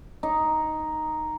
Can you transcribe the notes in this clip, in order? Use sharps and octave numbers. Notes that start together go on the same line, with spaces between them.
D#4